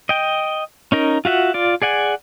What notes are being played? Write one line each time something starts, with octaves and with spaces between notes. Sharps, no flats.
D#5 G5
C#4 D#4 A#4
F4 F#4 E5 F#5
F4 D5
G#4 D5 F#5 G#5